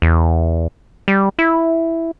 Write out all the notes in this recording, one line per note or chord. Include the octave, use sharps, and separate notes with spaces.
E2
G3
E4